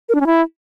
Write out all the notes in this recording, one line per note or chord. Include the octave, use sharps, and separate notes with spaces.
A#4
D4
C#4
E4